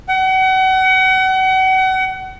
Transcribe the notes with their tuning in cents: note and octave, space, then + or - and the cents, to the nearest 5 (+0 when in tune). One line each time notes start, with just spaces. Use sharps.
F#5 +35